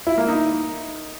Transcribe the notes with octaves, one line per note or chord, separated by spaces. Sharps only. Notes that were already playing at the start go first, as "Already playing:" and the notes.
E4
A#3
D#4